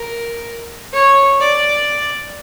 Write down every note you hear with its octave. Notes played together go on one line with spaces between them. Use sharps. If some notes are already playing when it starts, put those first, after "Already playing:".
Already playing: A#4
C#5
D5